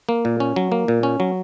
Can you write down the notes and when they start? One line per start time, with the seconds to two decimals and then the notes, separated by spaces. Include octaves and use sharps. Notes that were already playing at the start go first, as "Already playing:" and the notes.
0.09 A#3
0.25 A#2
0.40 C#4
0.56 F#3
0.72 A#3
0.88 A#2
1.03 C#4
1.20 F#3